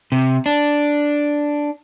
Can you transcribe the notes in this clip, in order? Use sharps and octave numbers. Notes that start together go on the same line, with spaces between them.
C3
D4